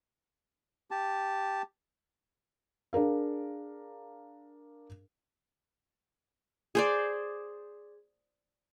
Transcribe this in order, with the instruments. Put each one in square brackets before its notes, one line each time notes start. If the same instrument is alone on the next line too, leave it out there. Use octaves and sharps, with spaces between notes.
[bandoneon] G4 A5
[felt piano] D4 G#4 A#4 F5
[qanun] G#4 C5 D5